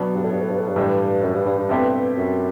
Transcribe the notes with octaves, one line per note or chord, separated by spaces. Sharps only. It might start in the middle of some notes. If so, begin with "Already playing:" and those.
Already playing: B2 F#3 B3 D4
G2
A2
G2
A2
G2
A2
G2
A2 E3 G3 D4
F#2
G2
G2
G2
B2 A3 C4 E4 G4
F#2